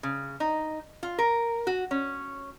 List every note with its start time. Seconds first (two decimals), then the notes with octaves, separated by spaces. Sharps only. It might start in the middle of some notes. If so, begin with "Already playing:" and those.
0.03 C#3
0.40 D#4
1.03 F4
1.18 A#4
1.67 F#4
1.91 C#4